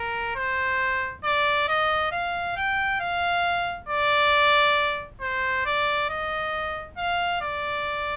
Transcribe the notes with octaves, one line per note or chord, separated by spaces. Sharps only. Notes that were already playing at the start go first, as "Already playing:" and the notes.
Already playing: A#4
C5
D5
D#5
F5
G5
F5
D5
C5
D5
D#5
F5
D5